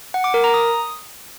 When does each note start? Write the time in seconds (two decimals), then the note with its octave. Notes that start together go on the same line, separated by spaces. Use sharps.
0.14 F#5
0.24 D6
0.34 A#4
0.44 A#5
0.54 D#6